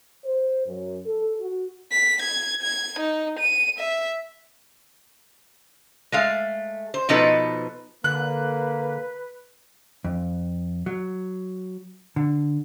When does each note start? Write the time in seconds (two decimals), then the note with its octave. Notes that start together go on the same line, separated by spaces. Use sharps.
0.25 C5
0.67 F#2
1.06 A4
1.39 F#4
1.92 B6
2.22 G#6
2.62 G#6
3.00 D#4
3.40 D#7
3.79 E5
6.12 G#3 A3 F5
6.94 C5
7.09 B2 F3 B3 D#4 A4 B4
8.04 D3 A#3 B4 F#6
10.05 F2
10.86 F#3
12.16 D3